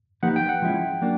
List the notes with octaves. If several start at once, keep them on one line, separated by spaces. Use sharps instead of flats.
F3 A#3 D#4 G4 B4 F#5
G5
F#5
F3 G#3 C#4 E4
F#3 A#3 D4